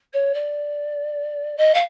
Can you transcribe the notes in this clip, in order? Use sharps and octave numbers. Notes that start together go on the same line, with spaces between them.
C#5
D5
D#5
F5